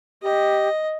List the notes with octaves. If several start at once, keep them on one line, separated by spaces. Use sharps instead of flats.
G4 D#5